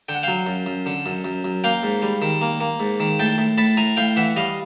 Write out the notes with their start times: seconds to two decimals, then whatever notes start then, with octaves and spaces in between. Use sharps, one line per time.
0.09 D3 G5
0.15 F#5
0.23 F#3 F5 G5
0.46 F#2
0.66 F#2
0.86 D3
1.06 F#2
1.24 F#2
1.44 F#2
1.64 A#3 F5 G5
1.83 G#2
2.02 G3
2.22 D#3
2.42 A#3
2.61 A#3
2.80 G#2
3.00 D#3
3.19 A2 G5 A5
3.38 A2
3.58 A2 A5 B5
3.77 A2 G#5 A#5
3.97 A2 F5 G5
4.16 E3 E5 F#5
4.36 G3 D#5 F5